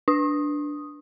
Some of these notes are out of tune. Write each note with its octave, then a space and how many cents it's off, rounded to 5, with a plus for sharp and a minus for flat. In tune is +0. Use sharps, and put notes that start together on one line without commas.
D4 +0 D#6 +0